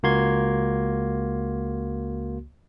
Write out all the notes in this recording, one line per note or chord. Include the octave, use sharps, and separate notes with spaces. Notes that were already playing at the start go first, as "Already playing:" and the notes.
C#2 A#3 F#4 C6 G#6